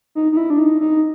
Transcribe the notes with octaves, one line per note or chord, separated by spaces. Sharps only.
D#4
D#4
E4
D4
D#4
D#4